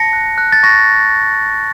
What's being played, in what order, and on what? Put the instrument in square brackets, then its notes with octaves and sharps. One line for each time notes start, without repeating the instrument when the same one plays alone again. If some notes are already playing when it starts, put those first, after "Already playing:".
Already playing: [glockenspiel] A5 A#6 C#7
F#6
F#6
A6
C#6 A#6